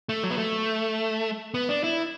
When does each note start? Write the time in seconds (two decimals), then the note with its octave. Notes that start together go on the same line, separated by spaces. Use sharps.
0.09 A3
0.23 F#3
0.31 B3
0.38 A3
1.54 B3
1.69 D4
1.84 E4